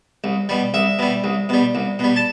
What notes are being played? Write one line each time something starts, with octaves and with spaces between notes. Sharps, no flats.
C2
B2 G3
C2 E5
B2 G3
C2
B2 G3
C2
B2 G3
A5